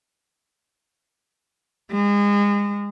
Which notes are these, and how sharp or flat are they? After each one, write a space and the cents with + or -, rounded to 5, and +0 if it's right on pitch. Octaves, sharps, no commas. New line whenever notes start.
G#3 -30